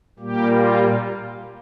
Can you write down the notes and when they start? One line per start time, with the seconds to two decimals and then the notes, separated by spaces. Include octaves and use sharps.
0.19 A#2 G3 A#3 G4
0.51 F4